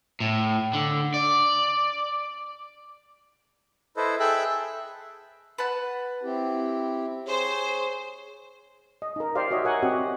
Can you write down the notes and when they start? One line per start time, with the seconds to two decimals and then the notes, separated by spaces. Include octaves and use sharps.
0.20 A2
0.73 D3
1.14 D5
3.97 E4 A4 B4 C5 D#5
4.20 G#4 A4 E5 G5 E6 F#6
5.58 B4 F#5 A5
6.23 C4 E4 G4
7.26 G#4 C5 C#5
9.02 D#5
9.16 D#4 A#4
9.35 G4 C5 D5 F5
9.51 F#4 C#5 D#5 E5
9.65 A#4 C#5 F#5 G#5
9.82 C4 F#4 G4 D#5